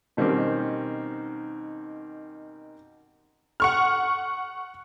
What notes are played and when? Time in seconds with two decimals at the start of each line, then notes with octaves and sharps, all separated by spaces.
0.17 B2 D#3 G3 C4 C#4 G4
3.60 F#5 C#6 F6